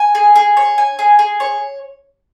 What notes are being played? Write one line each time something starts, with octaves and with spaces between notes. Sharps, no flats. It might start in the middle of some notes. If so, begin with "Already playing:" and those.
Already playing: G#5
G#4
G#4
C#5
G#5
G#4
G#4
C#5